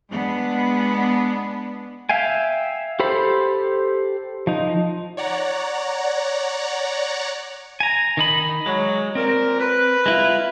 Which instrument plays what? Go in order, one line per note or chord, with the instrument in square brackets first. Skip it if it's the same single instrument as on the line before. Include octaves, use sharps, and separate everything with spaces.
[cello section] G#3 B3 D4
[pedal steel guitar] E5 F5 G5 G#5
G4 A4 C5 B5
F3 D#4
[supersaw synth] C#5 D5 F#5 A#5
[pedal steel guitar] G#5 A#5
D#3 D#4 B5
[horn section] F#3 [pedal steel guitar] G#3
[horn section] A#2 A#4 [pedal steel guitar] C4
[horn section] B4
[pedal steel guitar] G#3 E4 F4